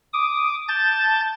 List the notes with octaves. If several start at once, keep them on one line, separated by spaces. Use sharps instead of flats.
D6 D#6
A5 G6 A6